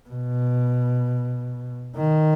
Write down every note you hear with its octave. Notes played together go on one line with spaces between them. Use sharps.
B2
D#3